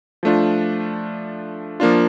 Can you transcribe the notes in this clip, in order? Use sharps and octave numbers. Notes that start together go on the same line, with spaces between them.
F3 A3 D4 F4
F3 A#3 D4 F4